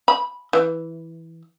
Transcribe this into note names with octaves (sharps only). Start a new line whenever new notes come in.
B5
E3